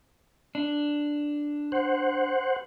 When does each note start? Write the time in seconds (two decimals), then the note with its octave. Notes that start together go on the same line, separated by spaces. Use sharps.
0.55 D4
1.72 C5 F#5